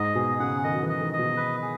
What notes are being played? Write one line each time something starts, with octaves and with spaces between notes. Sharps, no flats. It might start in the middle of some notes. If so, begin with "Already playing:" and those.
Already playing: G#2 D#5
B2 G#4
C#3 F#5
D#3 D#5
F#3
E3
D#5
D#3
D#5
B2
B4
G#4